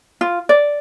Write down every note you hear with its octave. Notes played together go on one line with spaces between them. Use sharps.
F4
D5